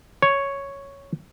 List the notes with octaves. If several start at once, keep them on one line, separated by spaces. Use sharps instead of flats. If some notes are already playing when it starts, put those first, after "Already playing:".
C#5